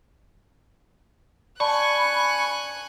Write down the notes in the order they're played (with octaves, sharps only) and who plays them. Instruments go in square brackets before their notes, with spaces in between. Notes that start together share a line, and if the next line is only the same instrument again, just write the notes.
[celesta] D5 A5 [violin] G#5 F#6 [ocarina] B5 [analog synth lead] C#6